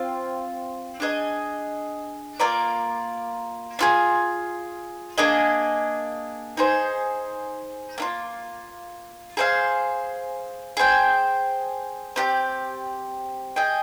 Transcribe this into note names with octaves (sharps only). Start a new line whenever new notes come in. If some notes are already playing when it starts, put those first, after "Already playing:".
Already playing: C4 F4 F5
D4 G#4 D#5
A#3 F4 A#4 D5
D4 F4 G#4
A#3 D4 G#4 D#5
D#4 G#4 C5
A#3 D4 F4
G#4 C5 F5
G#4 C5 G5
C4 G4 D5
G#4 D#5 G5